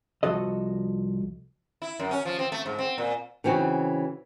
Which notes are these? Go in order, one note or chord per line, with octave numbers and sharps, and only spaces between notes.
C2 G2 F3 F#4 A4 D#5
E4
F#2
C#4
F3
C4
A3
G#2
C4
A#2
C#3 E3 C4 D#4 F#4